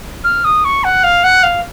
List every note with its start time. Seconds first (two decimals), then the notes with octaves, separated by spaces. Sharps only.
0.24 F6
0.45 D#6
0.65 C#6
0.84 F#5
1.04 F5
1.24 F#5
1.43 F5